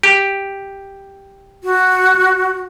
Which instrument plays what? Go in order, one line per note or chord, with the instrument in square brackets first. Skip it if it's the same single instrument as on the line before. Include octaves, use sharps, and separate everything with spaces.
[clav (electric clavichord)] G4
[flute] F#4